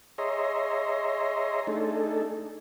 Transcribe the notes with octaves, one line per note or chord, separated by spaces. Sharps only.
G#4 C#5 D#5 E5 A#5 C6
A3 D4 D#4 G#4 A4